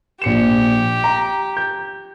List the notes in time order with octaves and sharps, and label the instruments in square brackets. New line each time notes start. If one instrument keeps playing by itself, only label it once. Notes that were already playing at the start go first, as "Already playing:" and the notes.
[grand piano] A#1 C#7 E7 [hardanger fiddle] G4
[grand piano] A#5
G6